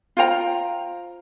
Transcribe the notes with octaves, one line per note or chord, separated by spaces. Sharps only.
F4 C5 G5 A#5